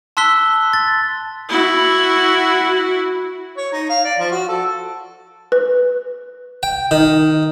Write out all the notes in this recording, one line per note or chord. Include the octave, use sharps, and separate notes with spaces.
A5 C6 E6 F#6 B6 G7
A6
E4 F#4
C#5
D#4
F5
D5
F3
F#4
A4
B4
G5
D#3